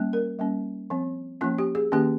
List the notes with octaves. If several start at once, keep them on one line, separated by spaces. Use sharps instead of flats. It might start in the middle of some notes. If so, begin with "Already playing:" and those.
Already playing: G3 A#3 C#4
A#4
G3 A#3 C#4
F3 C4
F3 A#3 C#4 F4
G4
G#4
D#3 A#3 C#4 G4